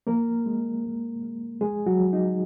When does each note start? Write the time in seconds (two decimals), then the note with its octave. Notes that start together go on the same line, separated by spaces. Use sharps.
0.07 F3 A#3 A#4
0.46 G#3
0.84 G#3
1.23 G#3
1.61 F3 G#3 G#4
1.86 F#3 F#4
2.00 F3
2.13 D#4